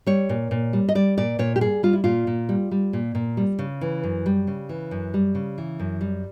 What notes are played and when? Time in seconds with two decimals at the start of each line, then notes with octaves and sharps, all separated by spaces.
0.07 G3 C#5
0.29 A#2
0.51 A#2
0.73 G3
0.89 D#5
0.95 G3 D5
1.18 A#2 D5
1.39 A#2 C#5
1.56 G4
1.61 G3 G#4
1.83 G3 F4
1.93 E4
2.04 A#2 F4
2.27 A#2
2.49 G3
2.71 G3
2.93 A#2
3.15 A#2
3.37 G3
3.59 C#3
3.81 E3
4.03 F#2
4.26 G3
4.47 C#3
4.69 E3
4.91 F#2
5.14 G3
5.35 C#3
5.58 E3
5.80 F#2
6.01 G3